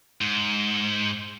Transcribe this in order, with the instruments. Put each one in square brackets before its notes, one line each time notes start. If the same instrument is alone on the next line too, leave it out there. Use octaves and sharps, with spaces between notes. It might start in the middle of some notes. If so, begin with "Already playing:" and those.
[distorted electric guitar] G#2